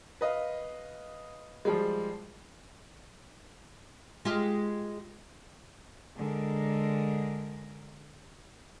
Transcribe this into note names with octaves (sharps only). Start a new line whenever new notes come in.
B4 D#5 F5
F3 G3 G#3
G#3 F4 G4
D3 G#3 A#4